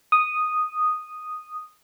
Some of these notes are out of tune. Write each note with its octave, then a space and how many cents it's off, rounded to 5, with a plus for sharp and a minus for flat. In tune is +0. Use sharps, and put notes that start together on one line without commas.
D#6 -5